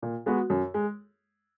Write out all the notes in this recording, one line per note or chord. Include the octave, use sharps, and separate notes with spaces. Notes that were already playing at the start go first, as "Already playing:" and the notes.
A#2
G#3 B3 F#4
F#2
G#3